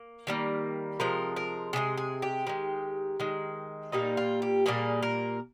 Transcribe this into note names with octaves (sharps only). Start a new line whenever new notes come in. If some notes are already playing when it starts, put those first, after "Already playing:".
Already playing: A#3
D#3 G3 A#3
C3 F3 G#3 A#4
A#4
C3 F3 G#3 G#4
G#4
G4
D#3 G#3
D#3 G#3
A#2 G3 A#3 D#4
F4
G4
A#2 G3 A#3 G#4
A#4